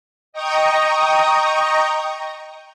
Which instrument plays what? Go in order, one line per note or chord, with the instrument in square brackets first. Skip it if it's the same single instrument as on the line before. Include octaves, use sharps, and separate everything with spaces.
[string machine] D#5 G5 A#5 C#6 D#6